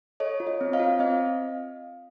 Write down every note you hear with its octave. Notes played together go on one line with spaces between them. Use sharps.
A4 C#5 D#5
F4
C#5 D#5
C4
D#5 F5
F4
C4 D#5 F5